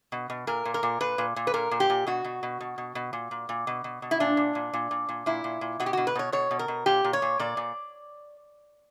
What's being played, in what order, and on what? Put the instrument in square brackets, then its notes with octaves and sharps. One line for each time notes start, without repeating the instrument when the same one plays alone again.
[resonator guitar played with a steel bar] B2
B2
A#2 A#4
A#2
A#4
A#2
A#2 B4
A#2
A#2
B4
A#2 A#4
A#2
G4
A#2
B2 F#4
B2
B2
B2
B2
B2
A#2
A#2
A#2
B2
B2
B2
E4
A#2 D4
A#2
A#2
A#2
A#2
A#2
A#2 E4
A#2
A#2
B2 F#4
G4
B2 F#4
B4
B2 C#5
B2 C#5
B2
A#4
B2
A#2 G4
A#2
C#5
A#2
A#2 D5
A#2